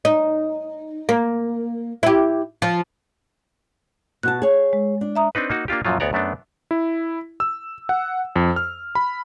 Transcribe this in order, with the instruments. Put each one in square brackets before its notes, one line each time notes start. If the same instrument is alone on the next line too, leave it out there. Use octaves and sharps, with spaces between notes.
[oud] D#4
A#3
E4 G4
F3
[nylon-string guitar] B2 F#4 A5 [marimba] F#6
[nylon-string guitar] G#4 C#5
[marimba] G#3
[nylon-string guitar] D4
[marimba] E5 A#5 D#6
[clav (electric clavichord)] C4 D4 D#4 B4
A#3 D#4 F#4
A#3 D4 F4 G4
F#2 A#2 F3 F#3 F4
D2 B3 C#5 D5 A#5
F#2 A3 B3 D4
[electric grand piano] E4
E6
F#5
F2
F6
B5